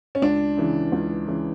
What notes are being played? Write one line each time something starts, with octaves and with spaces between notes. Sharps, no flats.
C#4
C#2 D4
C#3 E3
C#2
C#3 E3